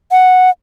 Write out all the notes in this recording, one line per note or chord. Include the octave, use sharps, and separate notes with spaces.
F#5